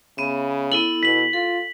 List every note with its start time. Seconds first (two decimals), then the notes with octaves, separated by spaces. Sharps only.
0.18 C#3 B3 E5
0.72 B3 E4 A4 F#7
1.03 B2 B6 F#7
1.33 F4 A4